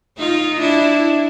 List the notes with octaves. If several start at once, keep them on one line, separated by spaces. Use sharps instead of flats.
D#4 F4
D4 E4